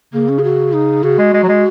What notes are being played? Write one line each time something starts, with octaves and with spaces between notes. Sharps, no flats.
C#3 A#3
C#4
G#4
F#4
D#4
C#3 F#4
G#3
G#3
F#3
G#3